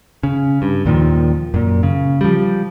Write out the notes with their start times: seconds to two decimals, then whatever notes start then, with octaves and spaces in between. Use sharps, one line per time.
0.23 C#3
0.62 G2
0.85 D#2 A#2 D#3 F3
1.54 F#2 A#2
1.83 C#3
2.21 F3 G3